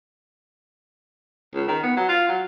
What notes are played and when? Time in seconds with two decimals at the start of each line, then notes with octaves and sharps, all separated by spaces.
1.54 C#2
1.68 D#3
1.83 B3
1.97 F#3
2.09 F4
2.28 F#3